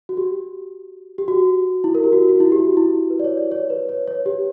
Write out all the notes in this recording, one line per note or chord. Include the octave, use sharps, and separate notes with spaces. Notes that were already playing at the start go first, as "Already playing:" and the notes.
F#4
G4
G4
F#4
E4
A#4
G4
F#4
F#4
E4
G4
F#4
E4
B4
D5
C#5
D5
C#5
B4
C#5
C#5
G4